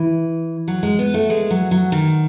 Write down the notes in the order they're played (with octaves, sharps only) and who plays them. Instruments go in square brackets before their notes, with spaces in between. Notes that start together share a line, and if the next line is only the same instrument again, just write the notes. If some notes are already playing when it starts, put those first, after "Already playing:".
Already playing: [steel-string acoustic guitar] E3
F#3
G#3
B3
A3
G#3
F#3
F#3
D#3